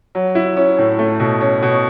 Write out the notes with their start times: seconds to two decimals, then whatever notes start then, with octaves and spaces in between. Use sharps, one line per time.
0.15 F#3
0.35 E4
0.56 C#4
0.78 A2
0.99 A3
1.20 B2
1.41 C#4
1.62 B2